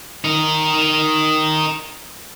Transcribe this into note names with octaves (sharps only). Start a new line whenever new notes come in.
D#4 A#4